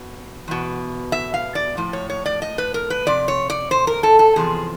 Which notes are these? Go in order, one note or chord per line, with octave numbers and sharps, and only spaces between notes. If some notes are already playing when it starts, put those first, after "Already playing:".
Already playing: B2
E2 B2
E5
F5
D5
A2 F3
C#5
C#5
D5
D#5
B4
A#4
B4
F2 C3 D5
C#5
D5
C5
A#4
A4
A4
E2 C3 F3 G#4